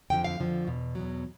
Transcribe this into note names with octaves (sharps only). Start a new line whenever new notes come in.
F2 D3 F3 G5
F5
F2 D3 F3
E2 B2
E2 B2 F#3